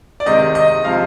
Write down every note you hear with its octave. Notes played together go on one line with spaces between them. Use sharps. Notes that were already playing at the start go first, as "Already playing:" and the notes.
D5
C3 D#3 G#3 D#5
D#5
C3 F3 G#3 F5